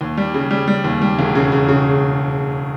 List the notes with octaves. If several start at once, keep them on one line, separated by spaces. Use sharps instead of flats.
D#2
G3
C#3
G3
G3
D#2
G3
E1
C#3
C#3
C#3